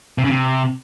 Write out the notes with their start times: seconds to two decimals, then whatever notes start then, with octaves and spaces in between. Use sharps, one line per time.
0.18 C3
0.24 C#3
0.30 C3